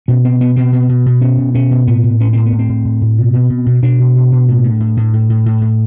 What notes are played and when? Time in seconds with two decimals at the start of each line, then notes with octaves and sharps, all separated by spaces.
0.08 B2 C#4
0.24 B2 C4
0.40 B2 B3
0.56 B2 C4
0.72 B2
0.89 B2
1.06 B2
1.21 B2 C#4
1.38 B2
1.55 B2 C#4
1.71 B2
1.87 A2 B3
2.04 A2
2.20 A2 C#4
2.33 A2 C4
2.46 B3
2.52 A2
2.59 C4
2.69 A2
2.85 A2
3.01 A2
3.18 B2
3.33 B2
3.50 B2
3.66 B2
3.82 B2 D4
3.99 B2
4.15 B2
4.32 B2
4.48 A2
4.64 A2
4.80 A2
4.97 A2
5.13 A2
5.29 A2
5.46 A2
5.61 A2